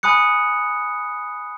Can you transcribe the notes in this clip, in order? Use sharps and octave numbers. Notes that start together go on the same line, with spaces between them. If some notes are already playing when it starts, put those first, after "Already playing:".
G#5 B5 D#6 F#6 C#7